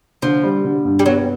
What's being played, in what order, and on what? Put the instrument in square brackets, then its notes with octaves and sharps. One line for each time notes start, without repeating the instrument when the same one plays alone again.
[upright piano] D3 [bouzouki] F3
[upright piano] G3
D3
G2
[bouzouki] G3
[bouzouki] F#3 [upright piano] B3